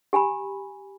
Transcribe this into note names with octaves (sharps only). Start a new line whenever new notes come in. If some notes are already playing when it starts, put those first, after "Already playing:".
G4 G#5 A#5 B5